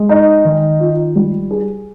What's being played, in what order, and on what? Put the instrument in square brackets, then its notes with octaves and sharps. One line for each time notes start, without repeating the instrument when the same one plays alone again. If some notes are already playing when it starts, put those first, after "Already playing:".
Already playing: [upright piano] G#3
D#4
D#3
F4
G3
G#4